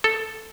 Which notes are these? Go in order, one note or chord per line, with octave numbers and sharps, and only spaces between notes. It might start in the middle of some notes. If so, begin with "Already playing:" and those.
A4